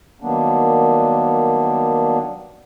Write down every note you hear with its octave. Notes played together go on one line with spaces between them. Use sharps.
D#3 F#3 G3 A#3 B3 D4